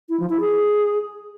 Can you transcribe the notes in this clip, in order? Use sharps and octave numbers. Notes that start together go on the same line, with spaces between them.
E4
F3
E4
G#4